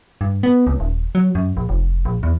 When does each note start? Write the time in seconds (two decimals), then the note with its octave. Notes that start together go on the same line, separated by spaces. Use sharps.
0.21 G2
0.43 B3
0.67 C#2
0.80 D#1
1.15 F#3
1.35 F#2
1.57 A#1
1.69 F1
2.05 A#1
2.23 E2